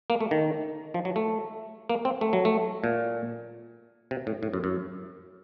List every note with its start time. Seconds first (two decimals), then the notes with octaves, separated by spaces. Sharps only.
0.10 A#3
0.21 A3
0.31 D#3
0.94 F3
1.05 F#3
1.16 A3
1.90 A#3
2.05 C4
2.21 A3
2.33 F#3
2.45 A3
2.84 A#2
4.11 C3
4.27 A2
4.43 A2
4.53 F#2
4.64 F#2